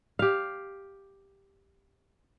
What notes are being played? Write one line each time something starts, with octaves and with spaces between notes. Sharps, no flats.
G4 F5